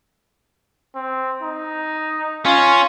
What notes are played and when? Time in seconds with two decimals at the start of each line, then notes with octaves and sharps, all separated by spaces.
0.95 C4
1.42 D#4
2.46 C#4 F4